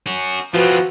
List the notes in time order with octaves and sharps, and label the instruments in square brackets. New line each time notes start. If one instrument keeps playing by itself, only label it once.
[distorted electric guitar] C#4 F#4
[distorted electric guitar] E3 C4 [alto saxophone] F3 [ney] F#4 [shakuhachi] B4